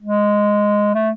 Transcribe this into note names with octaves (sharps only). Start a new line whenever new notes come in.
G#3
A3